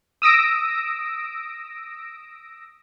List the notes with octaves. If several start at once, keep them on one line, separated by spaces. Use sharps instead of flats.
D#6 E6 A#6 D7